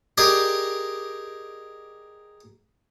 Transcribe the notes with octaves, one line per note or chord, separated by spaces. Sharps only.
G4 G#4 A#4 D5 D#5